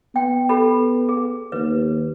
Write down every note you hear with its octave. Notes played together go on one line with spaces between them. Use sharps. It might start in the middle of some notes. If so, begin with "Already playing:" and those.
B3 G5
G4 A4 B5
G#4
D#2 B4